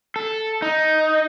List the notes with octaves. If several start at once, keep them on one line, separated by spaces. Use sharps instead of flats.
A4
D#4